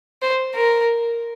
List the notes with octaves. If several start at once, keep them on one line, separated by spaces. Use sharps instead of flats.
C5
A#4